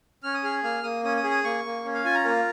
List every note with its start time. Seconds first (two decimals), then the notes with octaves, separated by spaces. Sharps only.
0.23 C#4 F6
0.34 D#6
0.44 G#4 F6
0.63 A#3 F6
0.83 A#3 D#6
1.04 C#4 D#6
1.17 D#6
1.24 G#4
1.30 D#6
1.44 A#3 C#6
1.65 A#3
1.85 C#4
1.94 F5
2.04 F4 G#5
2.15 A#5
2.25 A#3 A#4